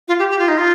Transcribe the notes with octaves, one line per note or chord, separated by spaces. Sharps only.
F4
G4
G4
F4
D#4
F4